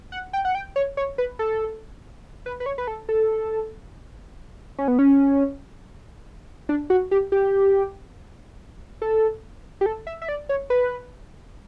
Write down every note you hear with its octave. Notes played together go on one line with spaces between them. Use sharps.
F#5
G5
F#5
G5
C#5
C#5
B4
A4
B4
B4
C#5
B4
A4
A4
C#4
B3
C#4
D4
F#4
G4
G4
A4
G4
A4
E5
E5
D5
C#5
B4